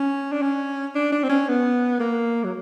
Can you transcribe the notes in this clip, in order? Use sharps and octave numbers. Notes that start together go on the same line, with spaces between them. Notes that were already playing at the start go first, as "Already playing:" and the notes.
Already playing: C#4
D4
C#4
D4
D4
C4
C#4
B3
A#3
F#3